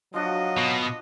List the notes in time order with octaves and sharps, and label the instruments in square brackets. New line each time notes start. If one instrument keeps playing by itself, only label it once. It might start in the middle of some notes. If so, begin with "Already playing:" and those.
[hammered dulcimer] F3 D4 F#4 [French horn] F#3 [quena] D#5
[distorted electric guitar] B2